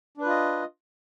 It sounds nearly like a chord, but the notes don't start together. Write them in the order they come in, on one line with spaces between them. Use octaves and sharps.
D4 B4 F4 D#5